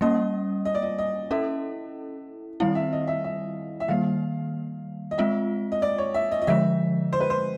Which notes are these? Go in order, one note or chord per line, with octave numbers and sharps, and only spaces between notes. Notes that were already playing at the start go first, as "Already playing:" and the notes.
G3 A#3 C#4 D#5
D#5
D5
D#5
D#5
C#4 E4 A4 E5
D#3 G3 C4 E4 F5
E5
D#5
E5
E5
E5
D#3 G3 A#3 F5
D#5
G#3 C4 F4 E5
D#5
D5
C#5
E5
D#5
D#5
D3 F3 G#3 E5
C5
B4
C5